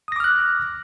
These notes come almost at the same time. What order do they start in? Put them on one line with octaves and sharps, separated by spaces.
D#6 A#6 D6 F6 F#6